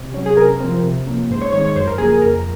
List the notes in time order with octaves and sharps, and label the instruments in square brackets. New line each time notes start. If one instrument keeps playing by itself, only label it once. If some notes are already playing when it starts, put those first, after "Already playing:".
Already playing: [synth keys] C3
F#3 C#4
G#4
C3 A#4
F3 C4
C3
F3 A#3 C#4
G#2 C5
C#5
D#3 G#3 C4 C#5
C#5
F#2 C5
A#4
C#3 F3 A#3 G#4
G#4
F2 A#4